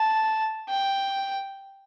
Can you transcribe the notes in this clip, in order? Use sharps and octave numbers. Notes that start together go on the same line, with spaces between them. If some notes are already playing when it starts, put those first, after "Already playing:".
Already playing: A5
G5